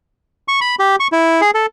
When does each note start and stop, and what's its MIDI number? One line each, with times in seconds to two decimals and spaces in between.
0.48 0.60 85
0.61 0.75 83
0.79 0.96 67
1.00 1.08 85
1.12 1.41 64
1.41 1.51 68
1.54 1.66 69